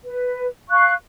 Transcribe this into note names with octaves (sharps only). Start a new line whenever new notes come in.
B4
F5 C#6 F#6